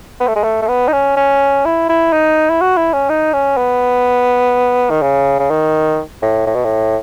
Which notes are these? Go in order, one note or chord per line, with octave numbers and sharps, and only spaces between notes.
B3
A3
G#3
A3
A3
B3
D#4
C#4
C#4
E4
E4
D#4
E4
F#4
E4
C#4
D#4
C#4
B3
D#3
C#3
C#3
D#3
A2
A2
B2
A2